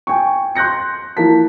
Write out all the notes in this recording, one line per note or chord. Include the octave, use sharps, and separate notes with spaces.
G5 G#5 C#6
C6 F#6 G6 A#6 C#7
E3 F3 A#3 A5 B6